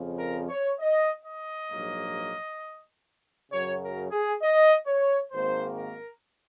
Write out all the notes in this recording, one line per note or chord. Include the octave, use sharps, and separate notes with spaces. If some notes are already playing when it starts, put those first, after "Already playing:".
Already playing: F2 C#3 F3
A#4
C#5
D#5
D#5
A#1 G#2 F#3 A#3
F#2 C#3 F#3 C#5
A#4
G#4
D#5
C#5
G#1 G#2 D#3 A#3 C5
A#4